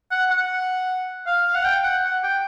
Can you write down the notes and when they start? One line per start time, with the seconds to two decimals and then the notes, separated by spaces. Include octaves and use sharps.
0.11 F#5
0.31 F#5
1.27 F5
1.55 F#5
1.65 G5
1.84 F#5
2.04 F#5
2.23 G5